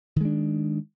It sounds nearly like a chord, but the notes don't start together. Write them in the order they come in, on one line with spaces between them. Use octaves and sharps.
D#3 G#3 D4